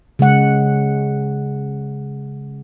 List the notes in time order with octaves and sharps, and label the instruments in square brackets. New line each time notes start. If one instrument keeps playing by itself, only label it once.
[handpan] C#3 G#3 F#5